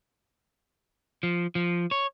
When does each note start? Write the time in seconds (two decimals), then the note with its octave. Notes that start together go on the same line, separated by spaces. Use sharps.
1.23 F3
1.55 F3
1.91 C#5